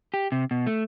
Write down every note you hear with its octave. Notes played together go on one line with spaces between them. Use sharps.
G4
C3
B2
A3